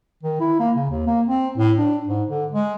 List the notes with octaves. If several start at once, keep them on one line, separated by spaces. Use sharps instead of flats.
D#3
E4
A#3
C#3
D#2
A#3
C4
A2
D4
G#2
D3
G#3